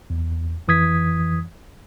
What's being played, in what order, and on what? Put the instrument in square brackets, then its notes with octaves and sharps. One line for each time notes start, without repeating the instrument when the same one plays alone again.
[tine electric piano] E2
F2 E3 D#6 G#6 B6